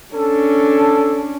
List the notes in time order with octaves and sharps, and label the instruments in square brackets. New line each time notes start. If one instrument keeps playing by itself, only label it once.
[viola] C#4 D4 [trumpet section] A4